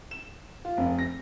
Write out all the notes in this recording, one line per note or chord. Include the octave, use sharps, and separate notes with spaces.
E7
F4
F1
A#6